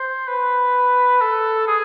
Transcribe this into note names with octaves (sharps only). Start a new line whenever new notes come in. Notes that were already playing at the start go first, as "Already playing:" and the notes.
Already playing: C5
B4
A4
G#4